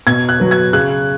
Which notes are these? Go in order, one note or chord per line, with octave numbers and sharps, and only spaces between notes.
B2 G#6
F#6
F#3 B3
G#6
C#3 F#6